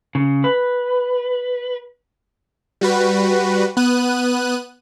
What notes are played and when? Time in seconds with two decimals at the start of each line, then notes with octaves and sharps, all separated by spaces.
0.15 C#3
0.44 B4
2.81 G3 F#4 B4
3.77 B3 F#6 D#7